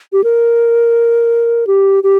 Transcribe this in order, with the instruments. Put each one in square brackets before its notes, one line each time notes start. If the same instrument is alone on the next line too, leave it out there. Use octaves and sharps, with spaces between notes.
[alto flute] G4
A#4
G4
G4